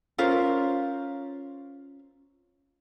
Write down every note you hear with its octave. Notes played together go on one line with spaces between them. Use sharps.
C#4 F4 A#4 C5